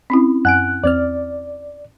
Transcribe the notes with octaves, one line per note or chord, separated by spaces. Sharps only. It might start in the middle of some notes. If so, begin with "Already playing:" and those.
C4 C#4 E4
F#2 F#5 G#5 F#6 D7
E2 C4 D5 F6